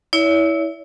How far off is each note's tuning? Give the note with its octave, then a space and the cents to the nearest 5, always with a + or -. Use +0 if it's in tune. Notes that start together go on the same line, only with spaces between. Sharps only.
E4 -15 C#5 +40 E5 +0